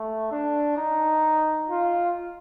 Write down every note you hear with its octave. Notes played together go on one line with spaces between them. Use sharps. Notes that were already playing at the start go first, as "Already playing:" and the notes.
Already playing: A3
D4
D#4
F4